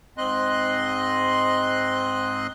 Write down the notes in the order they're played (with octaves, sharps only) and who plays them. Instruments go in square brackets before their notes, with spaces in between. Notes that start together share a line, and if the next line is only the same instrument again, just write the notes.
[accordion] G#2 C4 D#5 C6 F#6